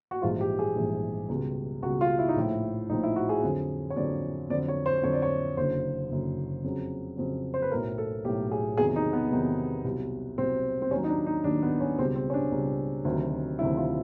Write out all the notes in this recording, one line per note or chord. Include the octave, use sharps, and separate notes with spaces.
F#4
A#1 G#2 E3 G3 F4
G4
G#4
A#1 G#2 E3 G3
C#2 B2 G3
C#2 B2 G3 F#4
F4
E4
D#4
A#1 A2 F3 E4
A#1 A2 F3 D#4
E4
F#4
G#4
F2 D3 F#3
C#5
F2 D3 F#3 D5
F2 D3 F#3 D5
C#5
C5
F2 D3 F#3 C#5
D5
C#5
F#1 F#2 D3 C5
F#1 F#2 D3
F2 C#3 F#3
F2 C#3 F#3
C5
B4
B1 A2 F#3 A#4
A4
B1 A2 F#3 G4
G#4
E2 C3 D#3 F#3 G#4
D#4
B3
E2 C3 D#3 F#3
C2 B2 F#3
C2 B2 F#3 C4
C4
D#2 D#3 F#3 C#4
D#4
D4
D#4
D#2 D#3 F#3 D4
B3
C#4
C#2 B2 G3 C4
C4
C#4
D4
C#2 B2 G3
D2 C3 D#3 F#3
D2 C3 D#3 F#3 E4
F4